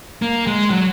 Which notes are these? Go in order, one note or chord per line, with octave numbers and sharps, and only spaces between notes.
A#3
G#3
F#3